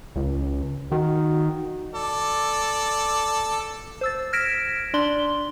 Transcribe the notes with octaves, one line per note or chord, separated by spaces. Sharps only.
C#2
D#3 F#4
A4 D5
C5 E6 A6
F6 G#6 A#6 B6 D7 E7
D4 D5 C6 G7